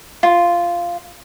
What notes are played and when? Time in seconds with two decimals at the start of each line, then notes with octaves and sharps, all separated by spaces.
0.23 F4